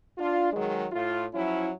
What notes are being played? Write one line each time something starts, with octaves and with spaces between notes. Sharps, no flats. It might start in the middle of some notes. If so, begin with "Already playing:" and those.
D4 F4
D#3 F#3 G#3
A2 F4
F3 F#3 C#4 E4